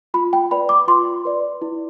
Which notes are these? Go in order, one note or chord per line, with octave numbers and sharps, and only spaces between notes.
F4 B5
G5
B4 D5 B5
D6
F4 C6
B4 D5
E4